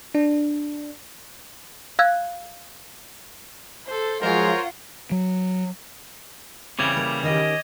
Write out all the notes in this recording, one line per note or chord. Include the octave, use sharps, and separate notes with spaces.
D4
F5 E6 F#6 G#6
A4 C5
F3 F#3 G#3 F4 A#4 C5 C#5 F#5
F#3
C#3 E3 G3 C4 D6 G#6 F7
A#3
D#3 C#4 G4 D#5